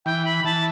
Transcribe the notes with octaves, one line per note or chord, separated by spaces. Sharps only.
E3 G5
B5
E3 A5